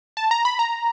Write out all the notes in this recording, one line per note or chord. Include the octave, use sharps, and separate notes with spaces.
A5
A#5
B5
A#5